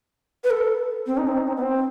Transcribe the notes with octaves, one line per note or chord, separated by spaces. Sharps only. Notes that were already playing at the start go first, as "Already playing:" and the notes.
B4
A4
C4
D#4
C4
D#4
C4
B3
C4